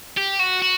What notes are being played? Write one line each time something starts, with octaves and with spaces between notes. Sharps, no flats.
G4
F#4
F#4